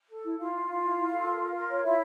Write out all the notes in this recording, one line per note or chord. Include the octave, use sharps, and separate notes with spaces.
A4
E4
E4 F4 F5
E4
E4
E4
E4
A4
A#4
A#4
A#4
C#5
E4 F4 E5